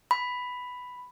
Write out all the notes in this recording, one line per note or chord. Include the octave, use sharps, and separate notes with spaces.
B5